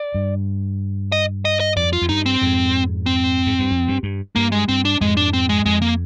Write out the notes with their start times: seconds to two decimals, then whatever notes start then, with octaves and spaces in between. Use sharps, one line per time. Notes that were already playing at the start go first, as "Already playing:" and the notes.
Already playing: D5
0.15 G2
1.12 D#5
1.45 D#5
1.60 D#5
1.76 F2 D5
1.93 F4
2.02 F2
2.09 G2 D#4
2.26 C4
2.41 F2 G#2
3.06 C4
3.46 G#2
3.59 G2
3.71 F2
3.88 G2
4.03 G2
4.36 G2 A#3
4.52 G#3
4.68 G2 C4
4.85 D4
5.01 F2 G#2 G#3
5.17 D4
5.33 C4
5.49 G#3
5.65 F2 G#3
5.82 A#3